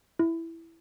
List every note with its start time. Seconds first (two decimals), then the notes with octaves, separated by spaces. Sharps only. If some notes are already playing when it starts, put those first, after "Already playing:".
0.19 E4